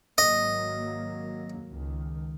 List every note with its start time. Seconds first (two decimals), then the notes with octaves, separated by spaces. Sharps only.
0.18 G#1 F#3 A#3 D#5
1.70 C#2 D#3